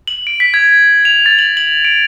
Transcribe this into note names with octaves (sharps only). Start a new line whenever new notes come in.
F#7
D7
B6
G#6
F7
A6
F#7
F#7
D7